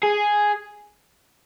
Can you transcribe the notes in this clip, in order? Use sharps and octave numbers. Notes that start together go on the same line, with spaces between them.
G#4